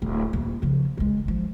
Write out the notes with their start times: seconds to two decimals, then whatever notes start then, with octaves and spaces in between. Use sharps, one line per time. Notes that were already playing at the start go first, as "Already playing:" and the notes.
0.02 D1
0.33 D#1
0.62 C#3 F3
0.97 D#3 G#3
1.24 G#1 F3